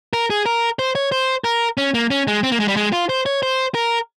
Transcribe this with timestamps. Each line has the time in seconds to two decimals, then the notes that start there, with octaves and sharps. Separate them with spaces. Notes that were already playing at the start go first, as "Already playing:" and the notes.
0.13 A#4
0.30 G#4
0.46 A#4
0.79 C5
0.95 C#5
1.12 C5
1.44 A#4
1.77 C#4
1.94 A#3
2.10 C#4
2.27 G#3
2.43 C4
2.52 A#3
2.60 G#3
2.68 G3
2.76 G#3
2.92 F4
3.09 C5
3.26 C#5
3.43 C5
3.75 A#4